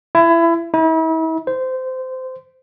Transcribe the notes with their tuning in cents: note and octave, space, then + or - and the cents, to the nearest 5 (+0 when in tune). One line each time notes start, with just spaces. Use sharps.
E4 +25
E4 -40
C5 -20